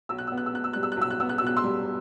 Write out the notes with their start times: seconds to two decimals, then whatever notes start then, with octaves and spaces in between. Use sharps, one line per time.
0.09 B1 E6
0.18 F#6
0.27 E6
0.32 B3
0.37 F#6
0.46 E6
0.53 B2 F#6
0.64 E6
0.73 G3 F#6
0.83 E6
0.92 F#6
0.97 B1 E6
1.10 F#6
1.20 B3 E6
1.29 F#6
1.38 B2 E6
1.47 F#6
1.56 C6 E6
1.64 G3